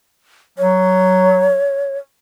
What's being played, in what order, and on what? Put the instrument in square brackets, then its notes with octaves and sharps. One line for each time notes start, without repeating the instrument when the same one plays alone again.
[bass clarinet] F#3 [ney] C#5